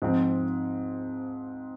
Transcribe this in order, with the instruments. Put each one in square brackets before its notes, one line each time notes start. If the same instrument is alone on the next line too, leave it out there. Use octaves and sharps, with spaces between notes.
[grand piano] G#2 F3 C4